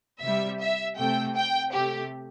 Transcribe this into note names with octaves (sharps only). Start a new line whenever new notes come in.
C3 G3 E5
E5
C3 A3 G5
G5
C3 A3 G4